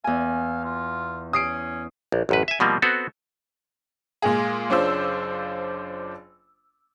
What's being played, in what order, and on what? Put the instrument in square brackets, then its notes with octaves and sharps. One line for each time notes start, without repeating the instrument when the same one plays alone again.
[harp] E2 G#5 [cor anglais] F5
[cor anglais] F4
[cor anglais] C#4 [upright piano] D#6 C7 D7
[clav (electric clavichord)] A#1
A1 F#2 B4
E5 G#5
B2 F3 G3 A#3 C4
B3 C4 F#4 A4
[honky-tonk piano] A#2 G#3 G#4
F#1 C#4 D4 F4 C5 E6